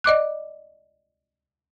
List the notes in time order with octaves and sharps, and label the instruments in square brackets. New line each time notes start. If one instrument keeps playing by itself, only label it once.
[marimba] D5 D#5 D6 F#6